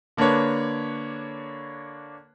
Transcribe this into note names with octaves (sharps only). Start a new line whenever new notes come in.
D3 A#3 D4 B4 C#5